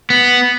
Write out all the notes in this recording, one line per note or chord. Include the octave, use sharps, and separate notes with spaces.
B3